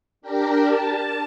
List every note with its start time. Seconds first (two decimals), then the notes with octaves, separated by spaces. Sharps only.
0.22 D4 G4 A#4
0.64 A5